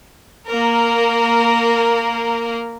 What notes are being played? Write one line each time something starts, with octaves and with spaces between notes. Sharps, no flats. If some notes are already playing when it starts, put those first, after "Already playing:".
A#3 A#4